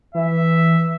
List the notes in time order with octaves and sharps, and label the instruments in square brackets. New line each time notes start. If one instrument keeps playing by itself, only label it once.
[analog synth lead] E3 [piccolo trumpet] E5